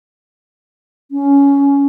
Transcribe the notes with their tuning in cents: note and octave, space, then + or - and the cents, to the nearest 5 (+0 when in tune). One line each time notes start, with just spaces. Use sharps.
C#4 +15